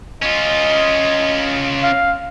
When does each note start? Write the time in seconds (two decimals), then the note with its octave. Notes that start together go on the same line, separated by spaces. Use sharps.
0.22 C#4 F4 D#5
1.83 F5